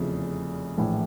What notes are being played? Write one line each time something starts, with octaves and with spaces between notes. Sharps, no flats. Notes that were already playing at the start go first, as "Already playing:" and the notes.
Already playing: F1 E2 C#3 F3
A#1 A2 E3